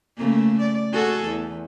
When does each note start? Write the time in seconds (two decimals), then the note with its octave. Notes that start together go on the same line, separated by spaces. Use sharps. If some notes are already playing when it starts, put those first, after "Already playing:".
0.17 C#3 A3 A#3
0.61 D5
0.93 F#4 G#4 A4
1.25 E2